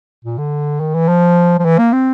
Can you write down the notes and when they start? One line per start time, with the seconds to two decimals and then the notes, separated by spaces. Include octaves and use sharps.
0.25 A#2
0.38 D3
0.80 D#3
0.94 E3
1.08 F3
1.59 F3
1.65 E3
1.79 A#3
1.93 C4